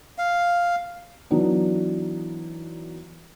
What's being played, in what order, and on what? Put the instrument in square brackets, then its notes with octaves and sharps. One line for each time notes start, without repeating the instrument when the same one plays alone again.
[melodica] F5
[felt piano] E3 F#3 B3 D4 D#4